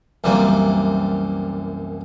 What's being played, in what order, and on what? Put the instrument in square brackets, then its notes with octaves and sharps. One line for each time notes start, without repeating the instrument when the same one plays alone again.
[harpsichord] C2 F#2 E3 G3 A#3